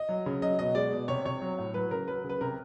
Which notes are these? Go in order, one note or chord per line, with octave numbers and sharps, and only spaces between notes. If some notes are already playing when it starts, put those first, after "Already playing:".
Already playing: D#5
F#3
C#3
F#3 D#5
B2 D#5
G#3 D5
B2
C3 C#5
C3 C#5
F#3
A2
F#3 B4
C#3 A#4
F#3 B4
C#3
B4
C3 A#4